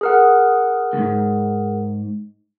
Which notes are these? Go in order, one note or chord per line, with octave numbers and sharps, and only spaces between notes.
G#4 A#4 F#5
D2 G#2